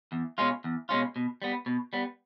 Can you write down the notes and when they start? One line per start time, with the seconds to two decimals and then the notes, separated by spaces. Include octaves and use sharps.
0.12 E2
0.38 B2 G#3 C#4 F4
0.64 E2
0.89 B2 G#3 C#4 F4
1.16 B2
1.42 G3 B3
1.66 B2
1.93 G3 B3